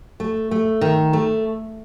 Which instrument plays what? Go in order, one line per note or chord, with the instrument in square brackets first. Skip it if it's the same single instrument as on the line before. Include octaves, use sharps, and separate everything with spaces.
[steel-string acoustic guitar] A3
A3
D#3
A3